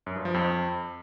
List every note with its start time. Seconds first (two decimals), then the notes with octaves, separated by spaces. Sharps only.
0.06 F#2
0.16 G2
0.25 F3
0.34 F2